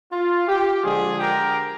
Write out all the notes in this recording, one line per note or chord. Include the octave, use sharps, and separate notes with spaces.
F4
G4
D3 F3 G#3 F4 G#4
G4 A#4